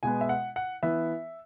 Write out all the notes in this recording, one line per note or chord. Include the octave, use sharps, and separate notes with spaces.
B2 G#3 B3 G#5
E5
F#5
F#5
E3 B3 E5